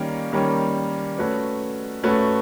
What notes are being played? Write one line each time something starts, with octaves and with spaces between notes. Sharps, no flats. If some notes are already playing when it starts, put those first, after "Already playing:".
Already playing: D#3 G3 A#3 C#4
D#3 G3 A#3 C#4
A3 C#4 F#4 B4
A3 C#4 F#4 B4